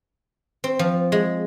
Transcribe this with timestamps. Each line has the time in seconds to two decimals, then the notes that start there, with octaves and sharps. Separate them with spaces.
0.64 C4
0.79 F3
1.12 G#3